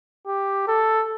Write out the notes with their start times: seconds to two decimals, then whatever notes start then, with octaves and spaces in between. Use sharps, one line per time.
0.27 G4
0.68 A4